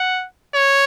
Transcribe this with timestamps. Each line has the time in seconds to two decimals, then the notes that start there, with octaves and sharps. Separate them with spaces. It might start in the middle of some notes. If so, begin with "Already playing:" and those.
Already playing: F#5
0.54 C#5